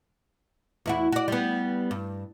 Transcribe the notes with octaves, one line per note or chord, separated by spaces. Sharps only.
E2 E4 F#4
F#4 D5
G3 B3
G2